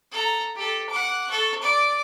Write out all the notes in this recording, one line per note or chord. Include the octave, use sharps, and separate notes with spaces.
A4 A#5
G4 A4
F#5 D6
A4 C#6
D5